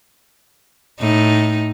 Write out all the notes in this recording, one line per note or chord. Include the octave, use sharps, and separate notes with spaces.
A2 D#4